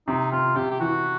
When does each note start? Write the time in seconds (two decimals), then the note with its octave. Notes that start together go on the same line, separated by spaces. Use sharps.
0.07 C3 D#4
0.32 C3 F4
0.56 C3 G4
0.71 G4
0.80 E3 F#4